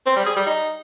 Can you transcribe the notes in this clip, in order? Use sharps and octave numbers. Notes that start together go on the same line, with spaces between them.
C4
G3
G#4
G3
D#4